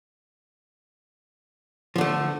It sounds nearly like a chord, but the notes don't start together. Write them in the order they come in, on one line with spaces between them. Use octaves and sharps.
F3 D3 A3